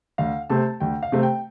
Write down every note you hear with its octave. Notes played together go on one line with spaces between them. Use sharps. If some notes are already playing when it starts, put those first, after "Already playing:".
D2 F5
C3 A3 C4 A5
D2 G5
F5
C3 A3 C4
G5